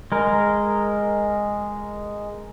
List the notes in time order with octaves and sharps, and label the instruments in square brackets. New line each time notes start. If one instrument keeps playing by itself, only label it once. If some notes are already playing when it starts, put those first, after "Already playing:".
[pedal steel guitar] G#3 A#4